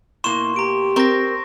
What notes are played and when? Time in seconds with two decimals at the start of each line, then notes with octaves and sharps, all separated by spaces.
0.24 B2 A#3 E4 C6 C#6 E7
0.56 G4 A#5 D7
0.96 C4 A#4 C#6 A#6